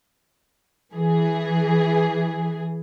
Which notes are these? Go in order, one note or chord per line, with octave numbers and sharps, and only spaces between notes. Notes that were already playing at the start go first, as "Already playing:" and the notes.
E3 G#4